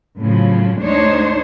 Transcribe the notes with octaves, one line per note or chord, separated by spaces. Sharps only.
A2 C#3 F3 F#3
D2 G#3 D4 D#4 C5 C#5